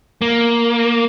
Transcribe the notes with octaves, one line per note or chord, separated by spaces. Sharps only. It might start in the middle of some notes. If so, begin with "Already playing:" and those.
A#3